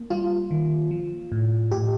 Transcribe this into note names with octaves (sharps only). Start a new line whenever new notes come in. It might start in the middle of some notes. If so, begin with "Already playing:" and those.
Already playing: A#3
G3 F4
D#3
F3
A2
A2 G4